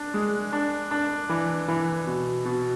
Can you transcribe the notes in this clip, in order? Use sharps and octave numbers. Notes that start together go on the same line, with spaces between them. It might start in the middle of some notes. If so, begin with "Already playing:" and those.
Already playing: D4
G#3
D4
D4
E3
E3
B2
B2